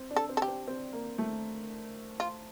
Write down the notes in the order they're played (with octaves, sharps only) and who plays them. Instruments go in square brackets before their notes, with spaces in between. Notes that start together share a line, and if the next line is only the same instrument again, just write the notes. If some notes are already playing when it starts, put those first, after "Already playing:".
Already playing: [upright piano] C4
D4
[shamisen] A4
[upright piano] C4
[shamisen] A4
G4
[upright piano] C4
C4
A#3
A3
[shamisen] F4